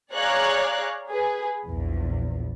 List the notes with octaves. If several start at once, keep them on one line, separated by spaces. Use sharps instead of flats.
G#4 C#5 D5 F5 A#5 F#6
G#4 B4
A#1 E2